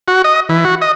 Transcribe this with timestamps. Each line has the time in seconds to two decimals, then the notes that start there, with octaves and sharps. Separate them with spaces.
0.08 F#4
0.24 D#5
0.49 E3
0.65 F#4
0.82 D#5